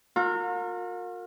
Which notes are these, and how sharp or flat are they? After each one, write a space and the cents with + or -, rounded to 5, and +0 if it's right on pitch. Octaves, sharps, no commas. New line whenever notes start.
F4 +45 A#4 -25